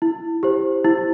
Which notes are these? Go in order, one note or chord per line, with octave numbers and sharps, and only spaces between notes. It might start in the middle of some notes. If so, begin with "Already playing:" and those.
E4
G4 C5
E4